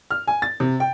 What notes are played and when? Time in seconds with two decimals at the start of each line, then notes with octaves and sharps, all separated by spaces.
0.11 F6
0.28 G#5
0.42 A6
0.60 C3
0.80 G5